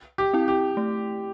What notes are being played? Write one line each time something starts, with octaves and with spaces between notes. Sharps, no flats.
G4
C4 E4
G4
A3